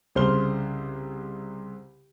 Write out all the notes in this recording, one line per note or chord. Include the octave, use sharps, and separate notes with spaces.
C2 C#3 C5 C6 F6 G7